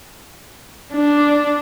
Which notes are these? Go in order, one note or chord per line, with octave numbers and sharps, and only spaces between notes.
D4